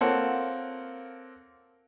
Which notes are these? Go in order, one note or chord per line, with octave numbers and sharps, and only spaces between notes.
A#3 C4 F4 A4 C#5 F#5